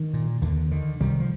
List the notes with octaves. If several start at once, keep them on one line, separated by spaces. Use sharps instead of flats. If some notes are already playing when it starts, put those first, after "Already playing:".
Already playing: D#3
A#2
D#2 D3
D3 D#3
C2 D#3 G3
F3